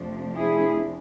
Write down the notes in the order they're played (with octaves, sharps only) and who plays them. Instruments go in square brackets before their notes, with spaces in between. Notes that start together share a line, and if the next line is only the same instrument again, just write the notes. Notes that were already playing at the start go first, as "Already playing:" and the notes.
Already playing: [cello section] F2 C3 F3 A3 D4
E4 G#4